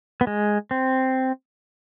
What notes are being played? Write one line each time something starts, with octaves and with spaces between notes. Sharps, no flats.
B3
G#3
C4